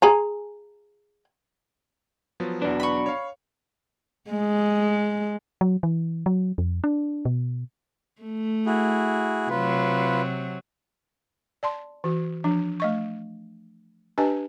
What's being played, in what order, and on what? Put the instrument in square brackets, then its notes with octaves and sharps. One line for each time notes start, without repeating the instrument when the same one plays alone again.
[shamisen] G#4 G#5 A#5
[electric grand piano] F3 F#3 B3
[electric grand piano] E2 B4 [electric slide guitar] B2 F#3 D4
[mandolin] B5 C#6
[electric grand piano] C#5 F5
[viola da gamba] G#3
[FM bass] F#3
E3
F#3
F2
D4
B2
[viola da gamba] A3
[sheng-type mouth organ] E4 F#4 G#4
[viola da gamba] C3 F#3 [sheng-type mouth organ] F4 B4
[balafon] D5 A5 C6
E3 F#4
F3 D4
A3 D#5 C#6
D4 G4 B4 D#5 G#5 A5